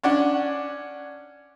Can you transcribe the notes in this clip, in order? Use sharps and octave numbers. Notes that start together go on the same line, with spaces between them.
C#4 D4 F#5